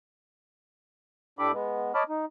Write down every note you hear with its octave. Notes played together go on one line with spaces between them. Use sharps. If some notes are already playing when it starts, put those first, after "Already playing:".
A2 D4 G4 A4 B5 D6
G#3 B3
C#5 D#5 A5 B5 D6 F6
D#4